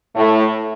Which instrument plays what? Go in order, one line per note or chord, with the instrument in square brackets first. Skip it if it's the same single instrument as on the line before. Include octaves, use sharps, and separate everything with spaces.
[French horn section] A2 A3